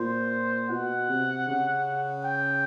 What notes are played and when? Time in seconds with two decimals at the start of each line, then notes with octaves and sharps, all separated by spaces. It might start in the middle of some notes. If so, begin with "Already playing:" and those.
Already playing: A#2 C5
0.70 B2 F#5
1.10 C3
1.48 C#3
2.24 G5